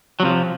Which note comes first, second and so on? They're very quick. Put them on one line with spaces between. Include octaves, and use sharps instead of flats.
F#3 C3 F3